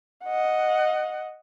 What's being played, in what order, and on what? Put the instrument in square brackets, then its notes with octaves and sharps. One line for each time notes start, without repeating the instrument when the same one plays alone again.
[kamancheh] D#5 F#5